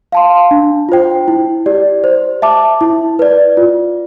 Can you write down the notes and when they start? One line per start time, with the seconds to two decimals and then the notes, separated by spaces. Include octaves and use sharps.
0.12 F5 A5 C6
0.51 D4
0.89 F4 C5 G5
1.28 E4
1.66 G4 D5
2.04 C5
2.42 E5 A5 D6
2.81 E4
3.19 B4 D5
3.57 F4